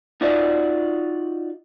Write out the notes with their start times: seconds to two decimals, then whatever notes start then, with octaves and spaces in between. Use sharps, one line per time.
0.21 D#4 F4 F#4 D5 E5